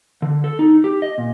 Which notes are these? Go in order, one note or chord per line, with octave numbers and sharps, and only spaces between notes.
D3
A4
D#4
G4
D#5
A#2